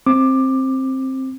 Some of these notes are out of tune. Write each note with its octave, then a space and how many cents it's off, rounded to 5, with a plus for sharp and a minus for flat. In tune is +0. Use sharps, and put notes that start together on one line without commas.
C4 +15 D6 +15